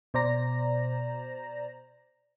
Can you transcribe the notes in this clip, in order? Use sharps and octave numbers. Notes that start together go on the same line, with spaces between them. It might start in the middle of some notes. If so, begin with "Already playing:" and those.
B2 C5 D5 A#5 A#6